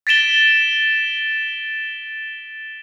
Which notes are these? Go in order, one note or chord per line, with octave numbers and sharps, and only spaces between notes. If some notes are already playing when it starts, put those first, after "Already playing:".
A6 B6 D7 E7 G7